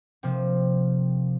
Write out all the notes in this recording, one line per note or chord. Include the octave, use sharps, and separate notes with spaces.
C3 F3 A#3 C4